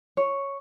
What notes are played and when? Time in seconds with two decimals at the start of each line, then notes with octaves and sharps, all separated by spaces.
0.17 C#5